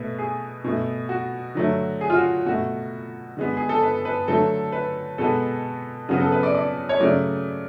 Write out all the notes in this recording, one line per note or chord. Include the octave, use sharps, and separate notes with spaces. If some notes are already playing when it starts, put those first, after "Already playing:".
Already playing: B2 A3 B4
G#4
B2 A3
F#4
D3 F#3 A3
G#4
F4
F#4
B2 A3 F#4
D3 G#3 B3
G#4
A4
B4
B4
D3 F#3 A3 A4
B4
B2 G#3 B3 A4
C#3 F#3 B3 F#4
A4
B4
D5
D5
C#5
C#3 F#3 A3 D5